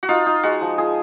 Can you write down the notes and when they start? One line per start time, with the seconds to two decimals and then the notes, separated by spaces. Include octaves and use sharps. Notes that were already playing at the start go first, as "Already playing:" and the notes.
0.03 F#4
0.09 D#4 F4
0.26 D#4
0.43 G#3 F#4
0.61 F3
0.78 F4 G#4